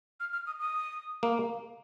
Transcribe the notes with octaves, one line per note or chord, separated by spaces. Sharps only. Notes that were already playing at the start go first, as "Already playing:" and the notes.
F6
F6
D#6
D#6
A#3